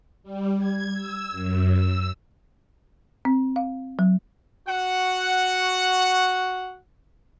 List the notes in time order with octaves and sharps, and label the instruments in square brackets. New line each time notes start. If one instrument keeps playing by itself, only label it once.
[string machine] G3
G#6
E6
F#2
E6
[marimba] C4
F5
F#3
[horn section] F#4 F#5